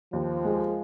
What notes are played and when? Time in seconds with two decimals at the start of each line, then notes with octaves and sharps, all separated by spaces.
0.13 D#2 F3
0.45 G#3